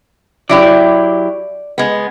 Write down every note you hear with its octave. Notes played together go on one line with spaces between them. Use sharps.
F#3 E4 G4 D5
G#3 B3